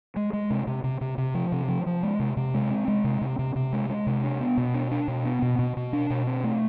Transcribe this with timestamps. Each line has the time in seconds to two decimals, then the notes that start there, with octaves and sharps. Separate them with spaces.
0.16 G#3
0.33 G#3
0.50 C3
0.67 C3
0.84 C3
1.01 C3
1.18 C3
1.35 F3
1.52 C3
1.68 F3
1.86 F3
2.03 G#3
2.19 C3
2.37 C3
2.54 G#3
2.71 C4
2.88 G#3
3.04 C3
3.21 C3
3.39 C3
3.56 C3
3.73 G#3
3.90 G#3
4.07 C3
4.24 D4
4.40 B3
4.57 B2
4.74 D4
4.91 D4
5.08 B2
5.25 B3
5.42 B2
5.59 B2
5.77 B2
5.93 D4
6.10 B2
6.27 C4
6.44 A3